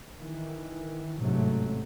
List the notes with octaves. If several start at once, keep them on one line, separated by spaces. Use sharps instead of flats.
D#3 E3
A1 G#2 C3 F#3 A3